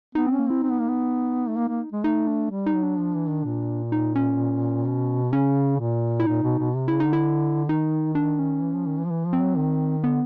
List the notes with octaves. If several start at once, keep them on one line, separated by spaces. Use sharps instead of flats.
B3 D#4
C4 C#4
A#3
C4 E4
C4 D#4
B3
A#3
B3
A3
A#3
A#3
G#3
A3 D#4
D4
G3
D#4
F#3
D4
F3
E3
D#3
A#2
D#4
C#4
B2
C#3 C#4
A#2
E4
A#2 D#4
B2
B2
C3
C#3 E4
D#4
D3
E4
D#3 D#4
D4
C#4
E3
F3
D#3
E3
F3
E3
F3
C4
F#3
D#3
D3 B3